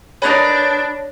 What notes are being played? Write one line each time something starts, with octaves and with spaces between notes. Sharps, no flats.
D4 D#4 A#4 B4 C#5 G#6 A#6